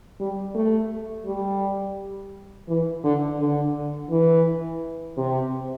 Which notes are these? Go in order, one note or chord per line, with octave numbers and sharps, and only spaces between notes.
G3
A3
G3
E3
D3
D3
E3
C3